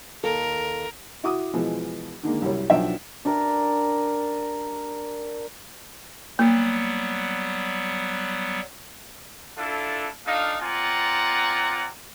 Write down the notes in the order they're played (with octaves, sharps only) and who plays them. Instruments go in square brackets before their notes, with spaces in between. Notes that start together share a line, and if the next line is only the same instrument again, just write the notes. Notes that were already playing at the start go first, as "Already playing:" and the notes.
[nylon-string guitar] D#2 A4 [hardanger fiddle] A#4
[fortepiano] E4 F#4 D6 D#6
B2 E3 F3 G#3
D3 D#3 G#3 A#3
C2 F#2 G3 C#5
B1 F3 D4 E5 G5
[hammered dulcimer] D4 G4 A#4
[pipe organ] F#3 G3 B3 [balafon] A#3
[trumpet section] D4 E4 F4 A4
D4 D#4 F4 A4 F5
C4 F4 D5 F#5 G#5 A#5